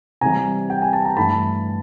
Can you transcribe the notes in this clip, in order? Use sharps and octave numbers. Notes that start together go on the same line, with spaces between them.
C3 E3 G3 G#5 A#5
G5
G#5
A5
A#5
G2 E3 A3 A5 B5